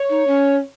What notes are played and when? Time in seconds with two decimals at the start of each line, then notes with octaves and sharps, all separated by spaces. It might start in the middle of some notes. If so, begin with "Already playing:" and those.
Already playing: C#5
0.09 D#4
0.27 C#4